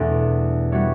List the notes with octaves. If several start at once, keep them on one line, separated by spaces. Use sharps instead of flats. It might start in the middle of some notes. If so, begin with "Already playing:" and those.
Already playing: E2 B2 A3 D4
G3 B3 F#4 C#5 E5